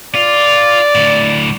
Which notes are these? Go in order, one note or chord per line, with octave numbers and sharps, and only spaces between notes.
F4 D5
D2 A2